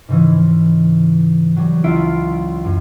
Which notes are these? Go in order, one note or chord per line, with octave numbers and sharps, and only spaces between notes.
G#2 C#3 E3
F#3 G3
C#2 E4 F4 E5 D7
F#2